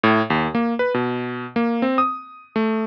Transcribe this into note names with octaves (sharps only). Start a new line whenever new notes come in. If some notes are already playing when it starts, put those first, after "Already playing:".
A2
D#2
A#3
B4
B2
A#3
C4
D#6
A3